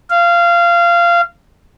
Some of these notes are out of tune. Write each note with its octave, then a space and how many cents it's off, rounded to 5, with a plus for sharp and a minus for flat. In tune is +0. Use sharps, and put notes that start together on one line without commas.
F5 -20